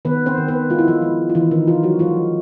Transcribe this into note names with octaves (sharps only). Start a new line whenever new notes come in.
D#3 B3 B4
C4 C5
D#3
B3 B4
G#3 F4
E4
F3 F4
G#3
F4
D#3 E3 E4
D#3 D#4
D#3 F3 F4
F#3 F#4
F3 G#3 F4